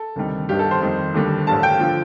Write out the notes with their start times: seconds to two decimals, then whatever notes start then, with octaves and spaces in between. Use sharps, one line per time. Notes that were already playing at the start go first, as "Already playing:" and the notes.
Already playing: A4
0.16 D2 C3 D#3 G3
0.49 G1 G2 D#3 G3 G4
0.59 A4
0.71 C5
0.81 F2 D#3 G3
1.14 D#2 D3 G3
1.47 A1 G2 D3 A5
1.63 G5
1.79 D3 F3